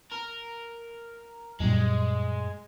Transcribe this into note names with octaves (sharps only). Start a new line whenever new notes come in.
A#4
F#2 A#2 G3 G#3